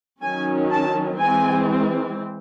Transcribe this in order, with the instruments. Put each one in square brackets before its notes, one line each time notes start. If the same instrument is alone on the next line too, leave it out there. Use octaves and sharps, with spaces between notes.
[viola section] D#3 F#3 C#4 G#5
A5
E3 G#3 C4 G#5